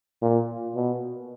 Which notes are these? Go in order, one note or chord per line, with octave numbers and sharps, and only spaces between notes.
A#2
B2